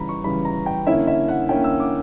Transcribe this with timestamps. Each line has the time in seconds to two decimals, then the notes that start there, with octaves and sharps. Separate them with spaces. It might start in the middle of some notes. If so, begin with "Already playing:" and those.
Already playing: C#3 E3 G3 A#5 B5
0.09 C#6
0.24 C#3 E3 G3 B5
0.45 A#5
0.66 G5
0.87 D3 A#3 C#4 E4 E5
1.07 E5
1.28 F#5
1.49 D3 A#3 C#4 E4 G5
1.64 E6
1.80 D6